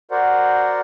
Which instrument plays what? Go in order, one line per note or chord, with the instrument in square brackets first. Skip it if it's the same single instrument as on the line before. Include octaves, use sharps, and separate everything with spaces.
[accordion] F#4 A#4 C5 D5 F#5